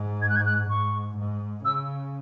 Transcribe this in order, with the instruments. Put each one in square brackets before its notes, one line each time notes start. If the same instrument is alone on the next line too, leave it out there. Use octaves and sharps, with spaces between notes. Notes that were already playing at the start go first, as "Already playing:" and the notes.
Already playing: [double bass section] G#2
[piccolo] G#6
F#6
G#6
F#6
[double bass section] G#2 [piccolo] C#6
[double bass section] G#2
[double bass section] C#3 [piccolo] E6